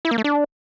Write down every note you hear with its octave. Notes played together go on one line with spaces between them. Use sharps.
E4
A#3
A3
D4